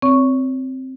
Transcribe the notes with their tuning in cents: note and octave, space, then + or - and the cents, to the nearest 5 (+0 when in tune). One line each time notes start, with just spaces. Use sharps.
C4 +0 C#5 +30 C#6 +0